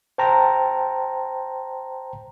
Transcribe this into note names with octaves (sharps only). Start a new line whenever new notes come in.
C5 G5 A5 A#5